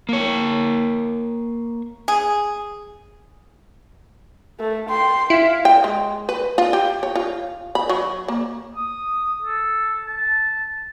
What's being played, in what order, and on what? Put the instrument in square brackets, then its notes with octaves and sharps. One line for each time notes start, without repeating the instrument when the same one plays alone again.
[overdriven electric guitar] A#3 C#5
[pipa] G#4
[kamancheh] A3
G5 C6
[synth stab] E4 [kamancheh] F5
[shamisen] G5
G#3
B4
F4
G4
C#5
F4
B5
F#3
A#3
[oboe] D#6
A4
A5